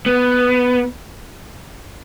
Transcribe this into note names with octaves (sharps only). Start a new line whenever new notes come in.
B3